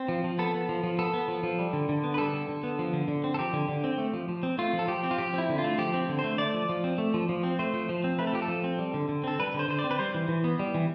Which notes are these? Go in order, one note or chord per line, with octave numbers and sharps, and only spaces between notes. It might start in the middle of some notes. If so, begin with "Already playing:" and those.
Already playing: C4
F3
F3
B3 A4
B3
F3
F3
B3 A4
B3
F3
F3
G3
D3
D3
B3
B4
G3 A4
D3
D3
B3
F3
D3
D3
C4
A4
F3 G4
D3
D3
C4
A3
F3
F3
C4
A3 F4
F3
A4
F3 G4
C4
F4
F3 G4
C4 E4
D3
F4
A3
F3 G4
C4
D3
C5
A3
A3 D5
F3
F3
C4
A3
F3
F3
C4
A3 C5
F3
F3
C4
A3 B4
A4
F3 G4
A4
F3
C4
G3
D3
D3
C4 A4
G3 B4
D3 C5
D3 C5
D5
C4
B4
G3 C5
E3
E3
B3
G3
E3